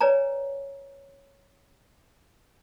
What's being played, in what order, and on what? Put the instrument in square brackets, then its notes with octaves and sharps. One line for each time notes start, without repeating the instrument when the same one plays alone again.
[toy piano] B4 C#5 D5 G#5 A#5